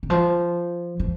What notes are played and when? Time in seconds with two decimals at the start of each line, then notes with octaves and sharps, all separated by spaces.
0.03 D#3
0.10 F3
1.00 F3